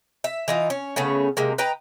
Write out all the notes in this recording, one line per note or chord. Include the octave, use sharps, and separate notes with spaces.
E5
E3 D#4 F4
C#4
C#3 A3 B3 C#4
C3 G#3 A#3
B4 D#5 G5 A#5